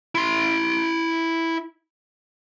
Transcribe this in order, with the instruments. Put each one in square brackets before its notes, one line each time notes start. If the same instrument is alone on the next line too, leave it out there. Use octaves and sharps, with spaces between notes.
[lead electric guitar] E4 C6